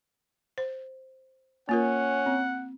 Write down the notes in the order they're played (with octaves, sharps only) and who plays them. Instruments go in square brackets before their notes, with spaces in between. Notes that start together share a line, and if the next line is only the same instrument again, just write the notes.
[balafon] C5
[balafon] A#3 F4 A#4 [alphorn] C#4 [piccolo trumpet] F#5
[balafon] C4